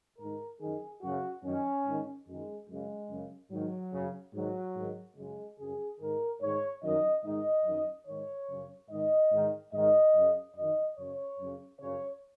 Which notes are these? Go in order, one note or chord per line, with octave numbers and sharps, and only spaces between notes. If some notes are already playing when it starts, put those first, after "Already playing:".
G#2 D#3 A#4
F#2 D#3 G#4
F#2 C#3 F#4
F#2 D#3 C#4
G#2 D#3
F#2 D#3 G#3
F#2 C#3 G#3
F#2 C#3
G#2 D#3 F#3
F#2 C#3
G#2 D#3 F#3
G#2 D#3
F#2 C#3 G#3
F#2 C#3 G#4
G#2 D#3 A#4
G#2 D#3 C#5
F#2 D#3 D#5
G#2 D#3 D#5
F#2 D#3
G#2 D#3 C#5
F#2 C#3
G#2 D#3 D#5
G#2 D#3
G#2 D#3 D#5
F#2 C#3
F#2 D#3 D#5
F#2 C#3 C#5
F#2 C#3
F#2 C#3 C#5